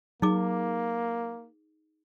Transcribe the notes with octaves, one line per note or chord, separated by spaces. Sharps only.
F#3 A#3 D#4 G#4 D6